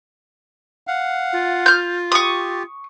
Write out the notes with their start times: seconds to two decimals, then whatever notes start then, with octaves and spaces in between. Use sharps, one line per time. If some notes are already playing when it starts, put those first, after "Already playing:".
0.87 F5 F#5
1.33 F4
1.66 F6 G6
2.12 G4 C#6 D#6